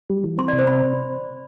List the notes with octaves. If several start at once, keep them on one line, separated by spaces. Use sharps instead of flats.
G3
E3
C4 C6
D5
C3
C5
C4 B5